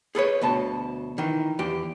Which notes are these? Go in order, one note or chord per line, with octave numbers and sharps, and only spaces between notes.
G#4 A4 B4 C#5
D2 B2 A5
D#3 E3
E2 G4